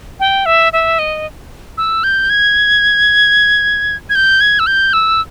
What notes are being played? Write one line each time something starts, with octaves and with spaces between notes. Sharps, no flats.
G5
E5
E5
D#5
E6
G6
G#6
G#6
G6
G#6
E6
G6
E6